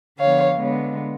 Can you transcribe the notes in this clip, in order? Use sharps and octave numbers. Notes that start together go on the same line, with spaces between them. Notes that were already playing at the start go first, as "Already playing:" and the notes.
D3 F3 B3 C#5 F5
D3 G#3 B3